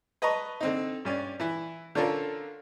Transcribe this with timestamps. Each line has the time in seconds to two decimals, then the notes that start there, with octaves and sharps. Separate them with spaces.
0.22 B4 D#5 A5 A#5 C#6
0.60 D3 C4 D#4
1.05 G2 C#4 D5
1.40 E3 E4
1.95 D3 C#4 D4 F4 A4 A#4